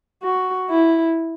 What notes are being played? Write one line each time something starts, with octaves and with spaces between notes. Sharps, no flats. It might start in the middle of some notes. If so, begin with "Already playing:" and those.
F#4
E4